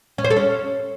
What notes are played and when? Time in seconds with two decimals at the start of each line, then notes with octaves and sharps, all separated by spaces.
0.18 C#4
0.24 C5
0.30 A4
0.37 C#4